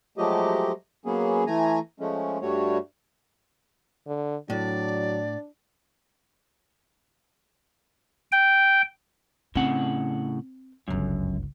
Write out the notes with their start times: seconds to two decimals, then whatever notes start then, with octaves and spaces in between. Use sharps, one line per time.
0.18 F3 F#3 G#3 A3 G4 D#5
1.05 F#3 A#3 B3 C#4 G#4
1.47 E3 A3 G#5 A#5
2.00 F3 G#3 A3 C#4
2.41 G2 G3 A3 F#4 C#5
4.07 D3
4.50 A2 F#3 D4 D5
8.32 G5
9.55 A2 C#3 C4 F#5
10.88 G1 C#2 F#2